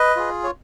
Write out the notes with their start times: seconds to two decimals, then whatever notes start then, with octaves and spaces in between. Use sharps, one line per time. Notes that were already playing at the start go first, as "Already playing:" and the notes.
Already playing: B4 D#5
0.16 F4 G#4
0.44 C#5